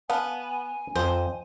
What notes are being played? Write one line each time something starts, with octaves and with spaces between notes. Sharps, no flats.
B3 F5 G#5 A5
F2 C5